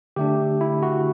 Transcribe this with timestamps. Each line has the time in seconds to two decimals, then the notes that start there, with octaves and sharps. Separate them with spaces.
0.16 D3 A3 D4 G4
0.61 E4
0.83 F#4